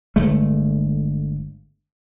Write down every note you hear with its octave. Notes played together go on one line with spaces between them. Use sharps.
G1 G#3 A3